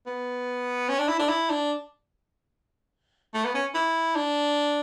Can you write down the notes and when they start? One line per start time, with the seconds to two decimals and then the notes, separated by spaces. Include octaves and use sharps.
0.07 B3
0.89 C#4
0.99 D4
1.09 E4
1.19 D4
1.29 E4
1.50 D4
3.34 A3
3.45 B3
3.55 C#4
3.75 E4
4.16 D4